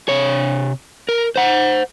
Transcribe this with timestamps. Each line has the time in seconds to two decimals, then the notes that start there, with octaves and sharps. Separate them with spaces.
0.09 C3 C#5
1.09 A#4
1.36 C5 F#5